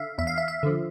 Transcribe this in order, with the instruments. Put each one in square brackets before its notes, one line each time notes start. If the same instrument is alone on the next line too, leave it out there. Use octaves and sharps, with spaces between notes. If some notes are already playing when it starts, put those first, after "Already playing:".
Already playing: [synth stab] D3 E5 F5
E2 E5
F5
E5
E5
D3 F3